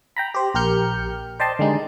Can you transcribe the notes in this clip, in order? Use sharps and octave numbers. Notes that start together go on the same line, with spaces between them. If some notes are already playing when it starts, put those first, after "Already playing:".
G5 A#5 B5
G4 C5
A#1 G4 A#4 F6 G6 C#7
C5 D5 D#5 G5 A5 C6
D3 D#3 G3 G#3 D#4